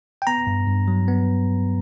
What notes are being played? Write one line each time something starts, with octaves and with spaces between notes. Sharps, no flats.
G5
B3 A#5
G2
G2
F#3
B3